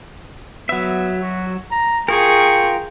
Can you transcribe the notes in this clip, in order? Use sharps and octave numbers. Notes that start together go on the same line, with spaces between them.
F#3 B3 E5
F#4
A#5
F4 G#4 A#4 G5 C#6